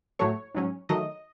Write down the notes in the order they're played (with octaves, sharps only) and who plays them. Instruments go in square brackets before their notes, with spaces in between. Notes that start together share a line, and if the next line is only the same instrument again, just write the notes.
[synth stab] A2 F#3 A3 C#5
G#2 F#3 C#4
D#3 F#3 A3 D#5